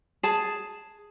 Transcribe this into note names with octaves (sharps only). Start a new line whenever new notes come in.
G#4 A5